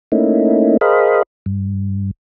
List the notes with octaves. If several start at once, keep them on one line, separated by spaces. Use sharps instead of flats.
A3 A#3 C#4 D#4 E4
G#4 A#4 C5 D#5 F5 B5
G2